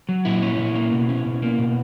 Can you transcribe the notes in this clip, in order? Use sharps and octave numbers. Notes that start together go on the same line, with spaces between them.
F#3
A#2 E4
C#4
A#2
A#3
B2
C#4
B2
A#3
B2